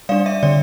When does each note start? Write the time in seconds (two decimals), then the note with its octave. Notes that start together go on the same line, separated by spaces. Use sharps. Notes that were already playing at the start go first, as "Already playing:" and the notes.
0.09 G3 D4 D5 F5
0.26 E5
0.43 D3 D5